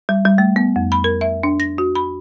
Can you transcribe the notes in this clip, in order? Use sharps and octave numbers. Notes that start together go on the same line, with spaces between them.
G3
G3
A3
B3
F2
B5
A#4
E5
D4
A#6
F#4
B5